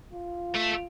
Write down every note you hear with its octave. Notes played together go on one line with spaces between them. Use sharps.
F4
A3